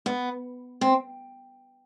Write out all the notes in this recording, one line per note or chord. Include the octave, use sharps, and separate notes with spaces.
B3
C4